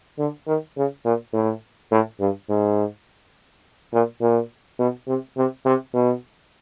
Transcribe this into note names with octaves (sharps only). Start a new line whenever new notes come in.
D3
D#3
C#3
A#2
A2
A2
G2
G#2
A#2
A#2
B2
C3
C3
C3
B2